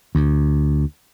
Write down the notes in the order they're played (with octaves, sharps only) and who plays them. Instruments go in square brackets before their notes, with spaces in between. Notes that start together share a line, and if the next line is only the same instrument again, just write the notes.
[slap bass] D2